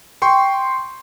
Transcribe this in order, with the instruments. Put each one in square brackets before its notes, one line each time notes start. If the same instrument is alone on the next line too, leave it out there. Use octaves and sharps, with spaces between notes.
[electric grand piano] G5 C6 C#6